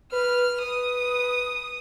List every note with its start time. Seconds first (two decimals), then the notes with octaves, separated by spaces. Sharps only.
0.13 B4 F6
0.63 B4 D#6